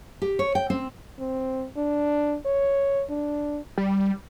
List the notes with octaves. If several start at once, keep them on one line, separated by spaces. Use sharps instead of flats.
G4
C#5
G5
C4
C4
D4
C#5
D4
G3